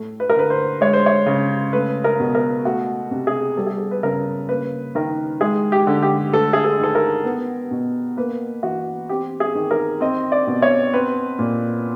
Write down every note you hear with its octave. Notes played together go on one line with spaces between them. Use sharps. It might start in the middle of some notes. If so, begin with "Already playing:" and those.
Already playing: A2 A3
B4
A#4
D3 B4
C5
G#3 C#5
C5
C#5
C#3
A3 B4
A#4
B2
A#4
A3 F#4
C3
G#4
G3 A4
G#4
A4
B4
C#3 A#4
A#3 B4
D#3 A#4
G#3 G#4
G4
D3
G4
A3 A4
G#4
A4
D#3 A4
A#4
B3
B2
A#3 B4
E3 F#4
C4 G4
G#4
D#3
A#4
C4 D#5
D5
B2
C#5
C4 B4
A#2